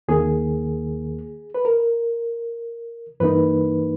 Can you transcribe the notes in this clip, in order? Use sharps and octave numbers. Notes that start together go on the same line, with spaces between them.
D#2 D#3 A#3 G#4
B4
A#4
G2 E3 A#3 D#4 B4